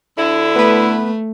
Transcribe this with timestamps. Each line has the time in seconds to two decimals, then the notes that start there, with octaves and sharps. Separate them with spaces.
0.17 D2 D3 E4
0.56 A3 B3 B4